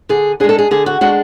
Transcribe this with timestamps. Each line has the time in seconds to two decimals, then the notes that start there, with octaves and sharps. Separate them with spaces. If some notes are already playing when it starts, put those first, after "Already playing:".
0.09 D3 G#4
0.40 D4 G#4
0.44 G#3
0.49 A4
0.59 G#4
0.71 D3 G#4
0.86 F#4
1.01 G#3 D4 F#4